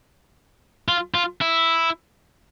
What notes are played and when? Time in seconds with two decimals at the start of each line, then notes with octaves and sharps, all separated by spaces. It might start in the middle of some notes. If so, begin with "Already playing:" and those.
0.88 F4
1.14 F4
1.41 E4